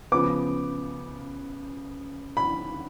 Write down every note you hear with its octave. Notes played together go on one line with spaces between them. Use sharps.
C#3 F3 B3 D6
B5